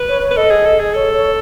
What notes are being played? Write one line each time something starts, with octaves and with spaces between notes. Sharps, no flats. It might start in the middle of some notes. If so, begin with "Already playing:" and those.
Already playing: B4
C#5
C#5
B4
A4 D#5
G#4
A4
G#4
A4 C#5
C#5